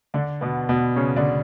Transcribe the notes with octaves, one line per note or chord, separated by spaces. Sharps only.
D3 D4
B2 B3
B2 B3
C#3 C#4
D3 D4